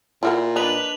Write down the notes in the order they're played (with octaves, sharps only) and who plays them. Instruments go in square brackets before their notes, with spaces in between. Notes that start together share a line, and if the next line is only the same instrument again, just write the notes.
[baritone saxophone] A#2 [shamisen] E4 F#4 A#4
[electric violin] D4 B4 [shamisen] D#4 [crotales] F#6 F7 F#7